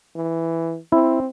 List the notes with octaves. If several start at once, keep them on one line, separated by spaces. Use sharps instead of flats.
E3
C4 E4